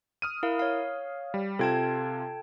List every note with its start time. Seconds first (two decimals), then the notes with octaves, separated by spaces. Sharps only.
0.22 D#6 F6 D#7
0.43 E4 A#4 F5
0.59 C#5 F5
1.34 G3
1.59 C3 F4 A4 G5 A5 G#6